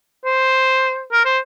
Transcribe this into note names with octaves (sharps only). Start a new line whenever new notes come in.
C5
A#4
C5